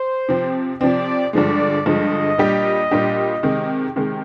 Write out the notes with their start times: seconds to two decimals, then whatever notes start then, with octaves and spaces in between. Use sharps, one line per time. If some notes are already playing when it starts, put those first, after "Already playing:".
Already playing: C5
0.29 C3 F3 C4
0.81 C3 F3 C4 D5
1.33 G2 D3 F3 G#3 D5
1.86 G2 D3 F3 G#3 D#5
2.38 A#2 G3 D4 G4
2.91 A#2 G3 D4 G4
3.43 C3 D#3 G#3
3.96 C3 D#3 G#3